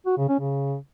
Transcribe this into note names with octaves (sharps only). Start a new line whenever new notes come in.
F#4
C#3
C#4
C#3